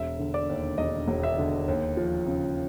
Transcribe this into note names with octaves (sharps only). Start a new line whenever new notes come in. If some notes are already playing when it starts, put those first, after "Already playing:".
Already playing: E1 E5
D3
D5
D#2
E1 D#5
E1
E5
D3
D#2
F3
C#3